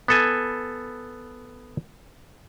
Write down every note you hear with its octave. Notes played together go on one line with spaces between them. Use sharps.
B3 A4 G#5